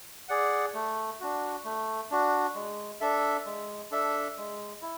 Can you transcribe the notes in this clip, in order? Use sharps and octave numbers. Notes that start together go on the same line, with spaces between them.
G#4 D5 F#5
A3
D4 F#4
A3
D4 F#4
G#3
D4 A4 E5
G#3
D4 A4 E5
G#3
E4